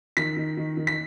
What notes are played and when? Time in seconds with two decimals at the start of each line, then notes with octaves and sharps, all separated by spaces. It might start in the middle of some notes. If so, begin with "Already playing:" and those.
0.17 D#3 B6
0.37 D#3
0.57 D#3
0.77 D#3
0.87 B6